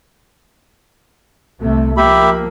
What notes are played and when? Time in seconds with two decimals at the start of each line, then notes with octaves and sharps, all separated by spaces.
1.60 C2 C3 A3
1.97 F3 A#3 G4 E5 B5